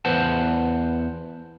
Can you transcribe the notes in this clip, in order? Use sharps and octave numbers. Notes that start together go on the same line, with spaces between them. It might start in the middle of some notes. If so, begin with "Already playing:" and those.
E2 B4 C5 F#5 A5